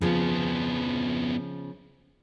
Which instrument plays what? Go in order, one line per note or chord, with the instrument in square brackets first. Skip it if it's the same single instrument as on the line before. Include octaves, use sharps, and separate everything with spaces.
[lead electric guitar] F2 B3 [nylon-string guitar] C#3 F3